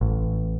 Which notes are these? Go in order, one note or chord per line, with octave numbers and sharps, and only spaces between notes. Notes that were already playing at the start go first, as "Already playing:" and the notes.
A1